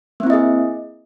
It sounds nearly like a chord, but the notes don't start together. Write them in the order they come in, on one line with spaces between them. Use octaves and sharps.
A#3 C4 E4 D#5 G#4